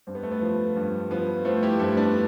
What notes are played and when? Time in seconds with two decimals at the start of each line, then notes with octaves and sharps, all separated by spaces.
0.07 G2 C4
0.15 B3
0.23 A3
0.31 B3
0.42 F3
0.76 G2
1.11 F3 B3
1.45 F3 A3 C4
1.63 E4 G4
1.80 G2 A3 C4
1.97 B3 D4